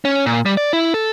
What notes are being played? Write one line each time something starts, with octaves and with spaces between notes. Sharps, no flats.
C#4
A#2
G3
D5
E4
A4